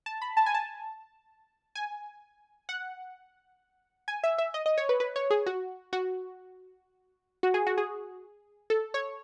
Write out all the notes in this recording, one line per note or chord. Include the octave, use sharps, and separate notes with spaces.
A5
B5
A5
G#5
A5
G#5
F#5
G#5
E5
E5
D#5
D#5
C#5
B4
B4
C#5
G#4
F#4
F#4
F#4
G#4
F#4
G#4
A4
C#5